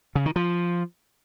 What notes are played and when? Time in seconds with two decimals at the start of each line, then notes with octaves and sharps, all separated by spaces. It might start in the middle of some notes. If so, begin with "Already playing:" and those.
0.15 C#3
0.26 D#3
0.36 F3